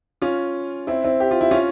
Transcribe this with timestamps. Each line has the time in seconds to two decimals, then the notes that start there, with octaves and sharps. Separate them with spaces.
0.22 C#4 F4
0.87 C4 E4
1.04 C4 E4
1.20 G4
1.31 F4
1.41 E4
1.51 C#4 F4